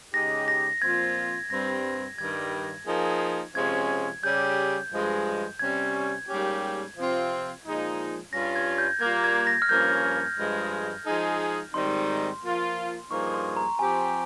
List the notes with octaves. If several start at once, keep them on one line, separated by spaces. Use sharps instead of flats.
C#3 G#3 D#4 G4 A#6
A#6
A#2 F3 C4 F4 G#6
G2 G3 C4 A#6
G2 D#3 G3 G#6
F3 A#3 D#4 G#4
C3 F3 G#3 C#4 G#6
C#3 G3 C#4 G4 G6
G2 F3 G#3
C3 G3 C#4 G#6
G#2 G3 A#3 C#4 G4
C3 F3 C4 F4
A#2 F3 G#3 D#4
G2 G3 C#4 F4 A#6
G#6
G6
A#2 G3 A#3 G#6
G#6
A#6
F6
G2 F3 A#3 C#4 G6
G2 F3 G#3
F3 G#3 D#4 G#4
G#2 D#3 G3 C4 D#4 C6
F3 A#3 F4
G2 F3 A#3 D#4 G#4 C#6
C6
A#5
F3 C4 G4 G#5